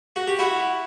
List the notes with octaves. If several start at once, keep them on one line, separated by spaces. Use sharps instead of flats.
F#4
G4
E4 F#4